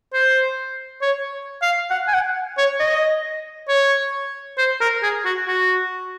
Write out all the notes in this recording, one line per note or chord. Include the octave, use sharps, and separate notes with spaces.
C5
C#5
F5
F#5
G#5
F#5
C#5
D#5
C#5
C5
A#4
G#4
F#4
F#4